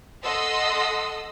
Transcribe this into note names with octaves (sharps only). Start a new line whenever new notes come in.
A4 D#5 F#5 C6 D#6 E6